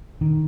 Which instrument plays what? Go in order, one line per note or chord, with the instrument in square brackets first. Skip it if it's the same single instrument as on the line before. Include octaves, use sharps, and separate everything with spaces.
[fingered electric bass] D#3